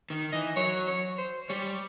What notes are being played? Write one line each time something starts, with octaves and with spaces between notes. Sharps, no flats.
D#3
E3 D#5
F#3 C#5
C#5
C5
G3 C#5